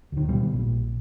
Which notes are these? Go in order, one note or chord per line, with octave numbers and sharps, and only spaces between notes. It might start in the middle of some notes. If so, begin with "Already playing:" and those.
D2 D#3
B2 G3
A#1